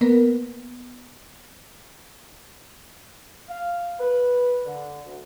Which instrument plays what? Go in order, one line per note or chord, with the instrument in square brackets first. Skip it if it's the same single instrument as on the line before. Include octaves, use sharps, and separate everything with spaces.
[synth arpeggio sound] A#3 B3 A#4 B4
[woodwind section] F5
B4
D3
D2